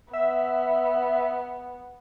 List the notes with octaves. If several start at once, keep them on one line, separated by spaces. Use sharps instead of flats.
B3 E5